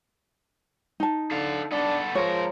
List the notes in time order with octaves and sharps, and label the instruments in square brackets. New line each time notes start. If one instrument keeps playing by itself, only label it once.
[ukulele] D#4 A5
[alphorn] D3 [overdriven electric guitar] A4 F5
[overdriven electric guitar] B3 A4 [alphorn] D4
[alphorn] F3 [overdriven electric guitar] G#3 A#4 [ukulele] C#5